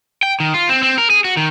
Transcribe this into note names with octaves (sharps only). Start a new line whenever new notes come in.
G5
D#3
F4
C4
C4
A#4
G#4
F#4
D#3